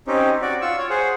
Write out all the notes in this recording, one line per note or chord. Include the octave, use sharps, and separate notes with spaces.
C4 C#4 D#4 G4
F#4 D5
F4 C#6 E6
C#5
G#4 C5 F#5